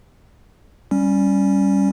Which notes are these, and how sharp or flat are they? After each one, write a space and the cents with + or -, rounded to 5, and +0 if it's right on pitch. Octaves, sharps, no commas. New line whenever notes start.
G3 +0 C#4 +0